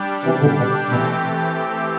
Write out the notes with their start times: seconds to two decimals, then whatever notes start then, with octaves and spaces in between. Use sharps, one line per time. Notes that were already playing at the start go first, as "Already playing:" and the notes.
Already playing: G3 D4 G4
0.24 C3 E3
0.41 B2 D3
0.58 B2
0.90 B2 E3 A3 C4 G4